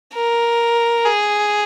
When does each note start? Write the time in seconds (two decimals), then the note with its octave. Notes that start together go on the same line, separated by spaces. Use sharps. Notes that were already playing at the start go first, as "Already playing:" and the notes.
0.14 A#4
1.05 G#4